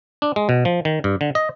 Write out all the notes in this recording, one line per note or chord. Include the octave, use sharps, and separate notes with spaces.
D4
G#3
B2
F3
D#3
G2
D3
D#5